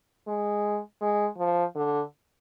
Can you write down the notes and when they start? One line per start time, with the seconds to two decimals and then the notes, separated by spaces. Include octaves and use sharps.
0.28 G#3
1.02 G#3
1.39 F3
1.76 D3